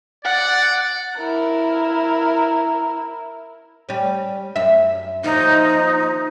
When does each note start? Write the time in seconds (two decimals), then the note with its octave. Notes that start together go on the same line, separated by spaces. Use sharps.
0.25 D5 F#5
1.19 E4 A#4
3.89 G3 C#4
4.56 F#2 E5
5.24 D#2 F3 D#4